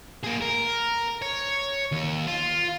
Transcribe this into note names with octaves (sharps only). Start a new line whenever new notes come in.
A#3 G#4
A#4
C#5
D#2
F4